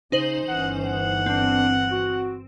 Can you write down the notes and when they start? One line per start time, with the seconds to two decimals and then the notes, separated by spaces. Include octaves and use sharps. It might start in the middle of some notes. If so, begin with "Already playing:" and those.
0.12 C#3 D#4 C5 F#7
0.48 G1 E3 C#4 F#5
0.84 F#5
1.26 C4 D4
1.92 F#4